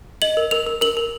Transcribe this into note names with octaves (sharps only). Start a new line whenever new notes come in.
D#5 F#7
A#4
A#4 F7
A#4
A#4 F#7
A#4